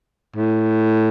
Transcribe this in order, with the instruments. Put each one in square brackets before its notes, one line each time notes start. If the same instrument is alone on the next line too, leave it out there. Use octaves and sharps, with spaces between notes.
[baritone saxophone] A2